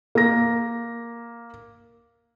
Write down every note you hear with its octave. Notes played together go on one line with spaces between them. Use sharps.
A#3 A#6